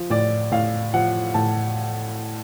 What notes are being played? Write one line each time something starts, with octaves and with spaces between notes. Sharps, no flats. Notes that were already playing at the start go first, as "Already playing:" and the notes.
Already playing: F3
A2 D5
A2 F5
F3 F#5
A2 A5